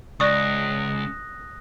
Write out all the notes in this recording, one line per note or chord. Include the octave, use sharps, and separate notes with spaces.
C#2 D5 C#6 D#6 F#6 A#6